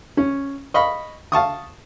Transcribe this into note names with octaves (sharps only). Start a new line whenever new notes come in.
C#4
D#5 F5 B5 C#6
F5 A5 C#6 D#6